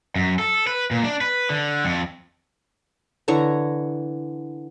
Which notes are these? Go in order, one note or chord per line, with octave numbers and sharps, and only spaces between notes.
F#2
A4
B4
A#2
D4
B4
D3
F2
D3 E3 C#5 A#5